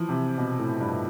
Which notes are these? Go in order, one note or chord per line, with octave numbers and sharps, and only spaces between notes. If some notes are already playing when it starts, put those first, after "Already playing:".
Already playing: E3 F3
C3
B2
A2
G2